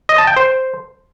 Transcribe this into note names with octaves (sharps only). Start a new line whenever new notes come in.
D#5
A5
G5
C5